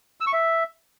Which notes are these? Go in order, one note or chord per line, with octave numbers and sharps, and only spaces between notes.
E6
C#6
E5